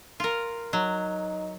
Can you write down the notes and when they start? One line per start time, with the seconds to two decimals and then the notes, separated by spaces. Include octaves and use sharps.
0.20 F4 A#4
0.73 F#3 D#4